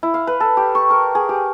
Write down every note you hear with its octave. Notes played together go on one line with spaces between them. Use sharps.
E4
F5
B4
A4
G4
C#6
A#4
G#4
G4